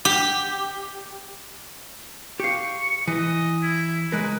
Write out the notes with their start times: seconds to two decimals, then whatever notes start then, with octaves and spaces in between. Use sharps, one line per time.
0.05 G4
2.40 G4 F5 C#6
3.08 E3 D#5
3.62 E4
4.12 C#2 G#3 A#4 B4